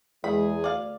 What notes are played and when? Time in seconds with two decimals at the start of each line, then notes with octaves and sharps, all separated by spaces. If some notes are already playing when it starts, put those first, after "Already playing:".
0.24 E2 G#3 G#4 B5
0.64 D2 D5 F5